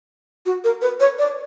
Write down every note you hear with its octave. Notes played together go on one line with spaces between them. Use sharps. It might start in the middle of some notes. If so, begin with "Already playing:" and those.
F#4
A#4
B4
C#5
D5